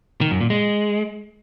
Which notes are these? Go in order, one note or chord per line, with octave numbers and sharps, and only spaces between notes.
D#3
F#2
A#2
G#3